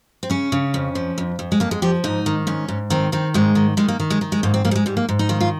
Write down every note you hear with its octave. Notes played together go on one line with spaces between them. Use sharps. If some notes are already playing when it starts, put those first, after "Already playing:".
C4
C#3 C#4
C#3
F2
F3
F2
F2
G#3
F2 A#3
G#3
F3 G4
G#2 D#4
D#3
G#2 C#4
G#2
D#3 C4
D#3 C4
G#2 G#3
D#3
D#3 G#3
A#3
D#3
G#3
D#3
G#3
G#2 A#3
C4
G#2 A#3
G3
G#3
G#2 G3
A#3
G#2
D#4
D#3 F4
F4